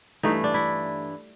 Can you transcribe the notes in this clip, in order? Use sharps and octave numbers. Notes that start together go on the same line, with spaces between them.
G2 E3 A3 D#4
D4
E4